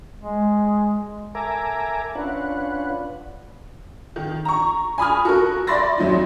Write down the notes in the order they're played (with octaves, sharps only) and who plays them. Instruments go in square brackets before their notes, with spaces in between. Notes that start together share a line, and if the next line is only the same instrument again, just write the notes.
[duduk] G#3
[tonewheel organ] A4 A#4 E5 G#5 A#5 D6
C#4 D4 F4 B4 F#5
[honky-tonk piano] D#3
A#5 C#6
G#5 B5 D#6 F6
F#4 A4 A#4
D5 E5 B5 C6 A6 A#6
F2 F#3 D#4 E4